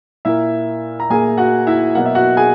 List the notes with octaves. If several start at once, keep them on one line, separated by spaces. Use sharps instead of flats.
A#2 A#3 E4 E5
A#5
A#2 A#3 G#4 G#5
F#4 F#5
E4 E5
B2 F#3 A#3 F#5
E5
F#4 F#5
G#4 G#5